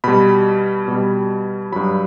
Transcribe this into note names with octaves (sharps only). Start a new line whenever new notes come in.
B2 G3 B5
B2 G3
G2 F#3 B5